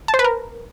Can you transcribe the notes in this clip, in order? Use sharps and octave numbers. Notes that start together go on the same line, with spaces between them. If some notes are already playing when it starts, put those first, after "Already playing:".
A5
C5
B4
A#4